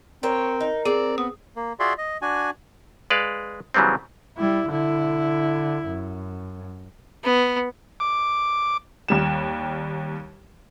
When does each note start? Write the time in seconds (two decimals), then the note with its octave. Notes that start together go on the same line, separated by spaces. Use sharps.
0.23 C4 A#4 C#5
0.60 D#4
0.85 C4 G#4 D5
1.18 B3 D#6
1.56 A#3
1.80 F4 F#4 G#4 D5 E5 C6
1.98 D#5
2.22 D4 F#4 G#5
3.10 G#3 B4 D5 F5
3.74 C#3 E3 F#3 G3 B3 C4
4.37 G3 E4
4.70 D3 E4
5.86 F#2
7.24 B3
8.00 D6
9.08 D#2 G3 E7